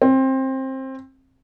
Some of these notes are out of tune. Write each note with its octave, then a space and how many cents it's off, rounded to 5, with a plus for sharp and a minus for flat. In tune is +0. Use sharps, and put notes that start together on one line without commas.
C4 +20